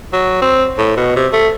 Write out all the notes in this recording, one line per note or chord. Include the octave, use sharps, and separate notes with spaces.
F#3
C4
A2
B2
C3
A3